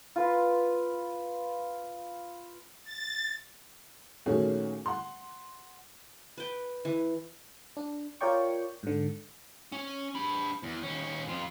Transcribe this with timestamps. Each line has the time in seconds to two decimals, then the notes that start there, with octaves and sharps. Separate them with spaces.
0.16 F4 B4 C6
2.83 A6
4.26 A#2 D#3 A3 C#4 F#4 G#4
4.86 F#5 C6
6.38 B4 G5
6.85 E3
7.77 D4
8.21 F4 A#4 C#5 D5 G5 C#6
8.83 G#2 D3
9.72 C#4
10.15 D4 B5
10.63 E2
10.83 D#2 C#4
11.27 F2 F4